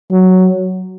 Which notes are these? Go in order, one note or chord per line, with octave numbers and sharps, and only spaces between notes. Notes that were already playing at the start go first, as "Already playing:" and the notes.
F#3